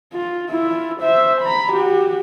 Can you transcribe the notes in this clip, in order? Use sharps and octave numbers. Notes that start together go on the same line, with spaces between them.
F4
E4 F4
C5 E5
A#5 B5
F#4 G4